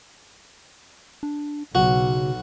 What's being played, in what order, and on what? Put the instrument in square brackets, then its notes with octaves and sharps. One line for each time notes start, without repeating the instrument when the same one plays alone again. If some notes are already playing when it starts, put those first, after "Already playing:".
[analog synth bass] D4
[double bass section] B1 [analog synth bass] C#3 [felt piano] F#3 [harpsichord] F#4